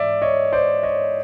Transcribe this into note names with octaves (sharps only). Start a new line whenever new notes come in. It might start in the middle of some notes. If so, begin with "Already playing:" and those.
Already playing: G#2 E3 D5 E5
C#5 D#5
C5 D5
C#5 D#5